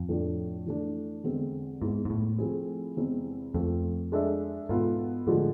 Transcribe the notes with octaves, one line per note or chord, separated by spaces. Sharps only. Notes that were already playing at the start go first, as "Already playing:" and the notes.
Already playing: F2
A2 F3 A3 D4
E3 A3 D4
E2 D3 G#3 C4
G#2 G#3 B3 E4
G#2
A2
F3 A3 C4 E4 G#4
E2 C3 G#3 C4 E4
F2 A3 C4 F4
G#3 D4 A4 E5
G#2 B2 B3 F4 A4
A2 D3 F3 G#3